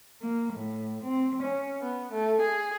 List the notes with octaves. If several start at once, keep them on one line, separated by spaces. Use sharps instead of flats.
A#3
A2
C4
C#4
B3
A3
G#4